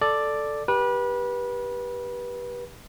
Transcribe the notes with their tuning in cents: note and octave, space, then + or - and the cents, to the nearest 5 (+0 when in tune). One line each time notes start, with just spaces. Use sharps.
A4 +0 D5 +5
G4 +0 B4 -25